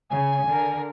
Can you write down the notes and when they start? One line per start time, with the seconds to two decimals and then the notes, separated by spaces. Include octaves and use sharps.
0.10 C#3 G#5
0.48 D3 A#4